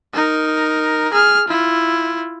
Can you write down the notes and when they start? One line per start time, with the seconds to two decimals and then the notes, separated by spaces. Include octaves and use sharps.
0.14 D#4 A#4
1.13 G#4 F6
1.48 E4 F4